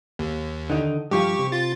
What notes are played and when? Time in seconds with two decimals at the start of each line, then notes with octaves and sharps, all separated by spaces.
0.19 D#2
0.70 D3 D#3 D#4
1.11 G2 F3 G4 F5 C#6
1.39 C3
1.52 F4 A6